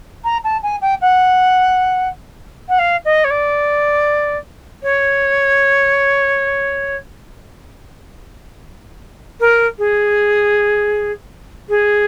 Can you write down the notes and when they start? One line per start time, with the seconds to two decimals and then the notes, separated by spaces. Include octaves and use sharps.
0.24 A#5
0.44 A5
0.63 G#5
0.81 G5
1.01 F#5
2.68 F#5
2.79 F5
3.05 D#5
3.24 C#5
3.30 D5
4.83 C#5
9.40 A#4
9.78 G#4
11.69 G#4